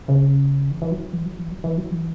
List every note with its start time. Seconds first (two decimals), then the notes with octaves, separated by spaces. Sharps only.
0.08 C#3
0.71 E3
0.82 E3
0.91 F#3
1.13 E3
1.26 F#3
1.38 E3
1.52 F#3
1.64 E3
1.77 F#3
1.91 E3